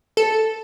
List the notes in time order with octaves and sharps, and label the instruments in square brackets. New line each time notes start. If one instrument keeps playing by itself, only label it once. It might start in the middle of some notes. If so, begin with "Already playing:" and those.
[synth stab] A4